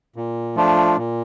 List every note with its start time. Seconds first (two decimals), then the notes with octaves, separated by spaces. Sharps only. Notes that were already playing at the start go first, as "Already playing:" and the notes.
0.16 A#2
0.56 F3 A3 D4 F4
0.97 A#2